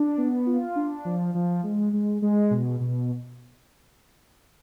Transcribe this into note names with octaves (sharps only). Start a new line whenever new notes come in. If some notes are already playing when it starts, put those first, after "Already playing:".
Already playing: D4
B3
F4
D4
F3
F3
G#3
G#3
G#3
B2
B2